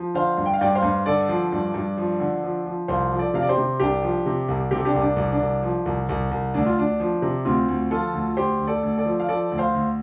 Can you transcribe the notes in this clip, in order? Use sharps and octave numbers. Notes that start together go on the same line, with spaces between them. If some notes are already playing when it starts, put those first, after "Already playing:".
Already playing: F3
D3 C5 F5
G2
G5
F5
G2 D5 G5
C5 F5
G2
D3 A4 D5
F3
G2
G2
F3
D3
F3
F3
C2 C5 F5
F3
A4 D5
C3 F5
D5
G4 C5
C3
C2 D4 G4
F3
C3
C2
C3 G4
A4
D4 G4
C2
D4
C2
D4
C2
F3
C2
C2
C2
D2 D4
F4
D2 D4
F3
C3
D2 C4 F4
D2
F3 F4 A4
D2
D2 G4 C5
D2
A4 D5
D2
A4 D5
F3
F5
F3 A4 D5
D2
C5 F5
D2